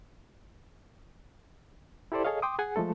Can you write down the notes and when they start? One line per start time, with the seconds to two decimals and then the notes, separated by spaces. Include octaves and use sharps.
2.12 E4 G4 A4 C5 D5
2.25 G#4 A4 C#5 D#5 F5
2.42 G5 C6 D6 D#6
2.59 G#4 F#5 G#5
2.76 F3 G#3 A3 A4